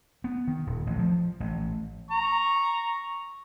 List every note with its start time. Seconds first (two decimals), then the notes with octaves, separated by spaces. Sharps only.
0.24 B3
0.48 D#3
0.67 D#1
0.87 A1
0.99 F3
1.40 A1
2.11 A#5 C#6